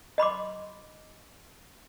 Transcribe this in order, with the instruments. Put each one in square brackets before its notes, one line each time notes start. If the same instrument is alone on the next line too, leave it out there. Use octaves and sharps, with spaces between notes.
[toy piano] D#5 B5 C6 D6